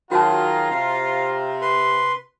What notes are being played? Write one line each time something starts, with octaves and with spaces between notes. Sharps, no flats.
D#3 F#3 F4 F#4 G#4 C#5 A5 A#5
C3 F5
B4 C6